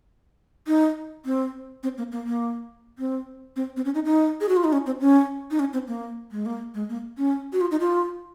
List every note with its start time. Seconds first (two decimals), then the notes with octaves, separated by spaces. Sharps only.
0.67 D#4
1.26 C4
1.83 C4
1.98 A#3
2.12 A#3
2.27 A#3
2.99 C4
3.56 C4
3.76 C4
3.85 C#4
3.95 D#4
4.05 D#4
4.41 G#4
4.49 F#4
4.56 F4
4.64 D#4
4.73 C#4
4.86 C4
5.01 C#4
5.51 D#4
5.59 C#4
5.73 C4
5.88 A#3
6.31 G#3
6.46 A#3
6.74 G#3
6.89 A#3
7.18 C#4
7.53 F#4
7.61 F4
7.71 D#4
7.80 F4